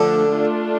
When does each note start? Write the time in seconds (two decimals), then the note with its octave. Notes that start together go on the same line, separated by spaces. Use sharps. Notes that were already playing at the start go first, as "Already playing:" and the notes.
Already playing: D3 F3 A3 D4
0.32 A3 D4 F4